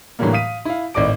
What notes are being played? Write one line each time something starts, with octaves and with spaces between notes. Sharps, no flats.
A2 D3 E3 F#3 G3 A#3
F5 D#6 B6 D#7
E4 F5
G#1 A2 D5 D#5 D6 D7